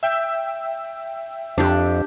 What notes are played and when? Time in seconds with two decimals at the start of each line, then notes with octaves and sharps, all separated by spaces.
0.03 E5 G5
1.58 F2 D4 G4